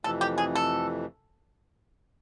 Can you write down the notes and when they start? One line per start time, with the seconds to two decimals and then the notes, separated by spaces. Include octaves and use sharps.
0.04 F2 C3 E3 A3 A4
0.21 G4
0.38 G#4
0.55 A4